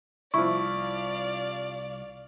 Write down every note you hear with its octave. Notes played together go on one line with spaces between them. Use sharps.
C2 F3 E4 D5 F5 C#6